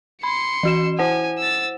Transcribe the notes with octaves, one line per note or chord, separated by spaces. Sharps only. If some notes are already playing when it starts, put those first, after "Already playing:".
B5 C6 C#7
E3 F#4 E7
E4 C5 F#5 G#5
E6 A6